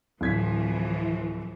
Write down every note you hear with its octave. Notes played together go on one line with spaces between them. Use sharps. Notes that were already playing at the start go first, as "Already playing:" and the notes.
D1 E3 F3 G#6 B6